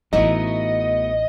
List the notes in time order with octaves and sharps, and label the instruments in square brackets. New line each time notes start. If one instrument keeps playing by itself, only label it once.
[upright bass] A1 [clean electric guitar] A3 B3 F#4 [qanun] D#4 E4 [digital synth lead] D#5